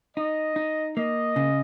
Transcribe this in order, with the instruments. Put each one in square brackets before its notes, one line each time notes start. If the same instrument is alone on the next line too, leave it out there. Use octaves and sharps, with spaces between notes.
[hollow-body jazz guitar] D#4 [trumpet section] D#5
[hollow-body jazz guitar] D#4
[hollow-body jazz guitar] A#3 [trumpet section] D#5
[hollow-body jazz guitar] C#3